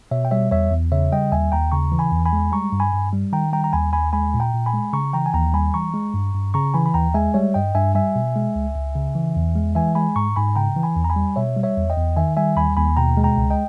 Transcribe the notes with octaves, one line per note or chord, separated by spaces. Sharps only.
B2 C#5 E5
G5
G3 C#5 E5
E2 C#5 E5
E2
C#3 C#5 E5
G3 D#5 G5
D#2 E5 G#5
D#2 G5 A#5
C#3 A#5 C#6
E3
G#5 B5
E2
G#5 B5
G#3
G3 A#5 C#6
G2
G#5 B5
G2
G3
D#3 G5 A#5
G3 G5 A#5
A#5
D#2 G#5 B5
D#2 G#5 B5
G#3 G#5 B5
A#2
G5 A#5
A#2
G#5 B5
G#3
C#3 A#5 C#6
E3 G5 A#5
G#5
D#2 G5 A#5
G3 G#5 B5
E3 A#5 C#6
G#3
G2
G2
C#3 A#5 C#6
E3 G#5 B5
B5
D#2 G5 A#5
G#3 E5 G#5
G3 C#5 E5
G2 D#5 G5
G2 E5 G#5
G3 E5 G#5
B2
G#3
C#2
C#2
C#3
E3
E2
G#3
E3 E5 G#5
G#3 G#5 B5
G#2 A#5 C#6
G#2 G#5 B5
C#3 G5 A#5
E3
G#5 B5
E2
A#5
G#5 B5
G3
B2 C#5 E5
G3
C#5 E5
E2
D#5 G5
E2
D#3 E5 G#5
G3 E5 G#5
D#2 G#5 B5
D#2 G#5 B5
B2 G5 A#5
G#3
G5 A#5
C#2
D#5 G5